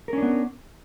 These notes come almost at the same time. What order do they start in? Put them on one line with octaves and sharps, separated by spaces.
A#4 C#4 D4 B3